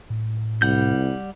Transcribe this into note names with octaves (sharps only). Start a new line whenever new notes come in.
A2
C2 G3 F#5 G6